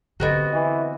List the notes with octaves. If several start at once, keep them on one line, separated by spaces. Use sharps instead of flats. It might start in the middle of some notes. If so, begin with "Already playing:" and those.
D3 B3 C4 D#4 F#4 G4 A4 D#5
E3 D#5